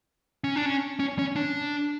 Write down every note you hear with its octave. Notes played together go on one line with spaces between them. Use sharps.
C#4
D4
C#4
C#4
C#4
D4